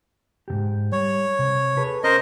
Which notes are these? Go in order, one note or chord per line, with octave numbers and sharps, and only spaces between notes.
G#2 B2 G4
G3 C#5
C3
G#4 A4 B4
C#4 A#4 C5 D#5